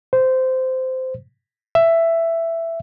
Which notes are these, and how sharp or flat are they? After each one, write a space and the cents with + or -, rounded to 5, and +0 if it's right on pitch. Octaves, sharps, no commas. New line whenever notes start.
C5 -15
E5 +10